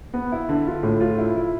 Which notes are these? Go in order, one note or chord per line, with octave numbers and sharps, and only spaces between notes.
B3
E4
D3
F4
A2
F4
E4
E4